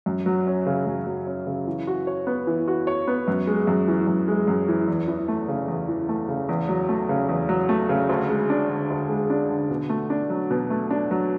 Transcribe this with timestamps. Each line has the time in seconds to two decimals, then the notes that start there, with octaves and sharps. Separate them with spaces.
0.06 F#2
0.26 F#3
0.47 C#4
0.66 C#3
0.86 F#2
1.07 F#3
1.27 C#4
1.47 C#3
1.67 E3
1.87 F#4
2.07 C#5
2.27 B3
2.47 E3
2.68 F#4
2.87 C#5
3.07 B3
3.28 F#2
3.47 G#3
3.67 F#2
3.88 E3
4.07 F#2
4.28 G#3
4.48 F#2
4.68 E3
4.88 E2
5.08 E3
5.28 A3
5.48 C#3
5.68 E2
5.88 E3
6.09 A3
6.29 C#3
6.49 E2
6.69 F#3
6.89 A3
7.09 C#3
7.29 E2
7.49 F#3
7.69 A3
7.89 C#3
8.09 D2
8.29 G#3
8.50 D4
8.69 D3
8.90 D2
9.09 G#3
9.30 D4
9.50 D3
9.70 B2
9.89 A3
10.10 D4
10.30 F#3
10.51 B2
10.70 A3
10.91 D4
11.11 F#3